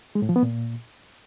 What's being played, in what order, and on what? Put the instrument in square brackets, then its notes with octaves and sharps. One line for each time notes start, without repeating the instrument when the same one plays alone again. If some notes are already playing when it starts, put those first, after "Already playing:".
[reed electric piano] G#3
A2
F3
B3
A#2